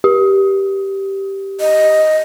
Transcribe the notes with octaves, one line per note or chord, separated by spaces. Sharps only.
G4
D#5